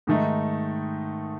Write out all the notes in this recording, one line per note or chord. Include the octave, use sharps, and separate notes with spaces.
G#2 D#3 A3 D#4